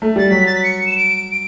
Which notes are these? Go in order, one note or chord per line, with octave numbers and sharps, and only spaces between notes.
A3
G3 A6
F#3 B6
A6
B6
C#7
E7
D7
D7